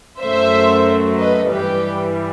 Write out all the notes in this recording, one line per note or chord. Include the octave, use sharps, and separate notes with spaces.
F#2 F#3 A3 C5 E5
B4 D#5
G2 E3 G3 G4 B4